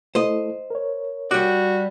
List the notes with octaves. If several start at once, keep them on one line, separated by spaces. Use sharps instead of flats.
A3 E4 A4 C5 D#5
A#4 C#5
G3 F#4 D5